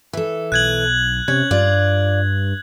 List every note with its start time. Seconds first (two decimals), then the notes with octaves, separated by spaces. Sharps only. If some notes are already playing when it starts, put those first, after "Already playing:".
0.13 E3 A4
0.52 B1 F#6 G#6 F#7
1.28 C3 C#4 G#6
1.51 G2 F4 D5